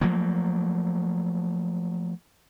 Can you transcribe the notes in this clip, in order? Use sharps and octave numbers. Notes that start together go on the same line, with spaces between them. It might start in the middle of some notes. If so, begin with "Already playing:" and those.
F3 F#3 A3 A#3